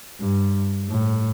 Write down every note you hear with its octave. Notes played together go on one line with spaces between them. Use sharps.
G2
A2